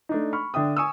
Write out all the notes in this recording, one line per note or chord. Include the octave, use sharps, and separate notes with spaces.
A3 D4 D#4
B5 C#6 F6
D3 D4 E5 G5 D#6
G#5 C#6 D#6 E6